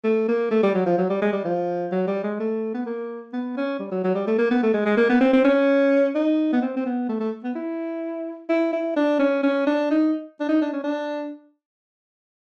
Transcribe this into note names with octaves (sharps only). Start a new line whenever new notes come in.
A3
A#3
A3
G3
F#3
F3
F#3
G3
G#3
G3
F3
F#3
G3
G#3
A3
B3
A#3
B3
C#4
G3
F#3
F#3
G3
A3
A#3
B3
A3
G#3
G#3
A#3
B3
C4
C4
C#4
D#4
B3
C4
C4
B3
A3
A3
B3
E4
E4
E4
D4
C#4
C#4
D4
D#4
D4
D#4
D4
C#4
D4